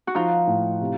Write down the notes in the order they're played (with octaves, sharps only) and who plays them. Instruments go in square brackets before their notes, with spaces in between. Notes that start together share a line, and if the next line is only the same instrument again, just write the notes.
[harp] F#4
[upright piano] F3 [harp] D#4 F4
[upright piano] A2
C3